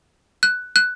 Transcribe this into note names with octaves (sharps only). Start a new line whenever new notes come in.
F#6
F#6